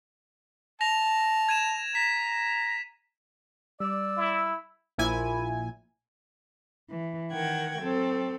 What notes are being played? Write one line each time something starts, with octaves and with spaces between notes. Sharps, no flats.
A5 A#6 F7
G#6 D#7 E7
A#5 B6
G3 D5 E6
E4
A#1 A#2 E4 G#5
E3
D#3 A#4 F#5 G5 G#6
F#3 C4 A4